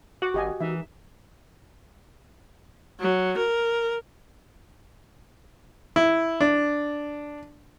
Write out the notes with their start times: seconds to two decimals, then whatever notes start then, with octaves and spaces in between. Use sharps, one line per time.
0.22 F#4 F#5 D6
0.34 G#1 G4 D#5 G#5
0.60 E3 D#4 E5
3.00 F#3
3.37 A#4
5.96 E4
6.41 D4